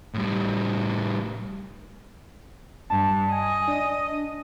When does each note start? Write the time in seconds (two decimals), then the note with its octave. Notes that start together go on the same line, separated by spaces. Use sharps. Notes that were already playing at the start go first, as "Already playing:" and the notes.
0.14 A2 G3
2.90 G2 A5
3.32 D#5 G#5
3.68 D4